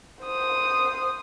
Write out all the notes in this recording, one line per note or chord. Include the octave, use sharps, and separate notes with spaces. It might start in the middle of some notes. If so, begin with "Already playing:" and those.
C5 D#6